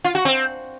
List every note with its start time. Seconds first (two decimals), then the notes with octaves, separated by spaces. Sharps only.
0.04 F4
0.15 F#4
0.25 C4